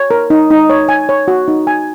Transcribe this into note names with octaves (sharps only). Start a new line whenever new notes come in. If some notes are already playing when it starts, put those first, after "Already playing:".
Already playing: C#5
A#4
D#4
D#4
C#5
G#5
C#5
F#4
D#4
G#5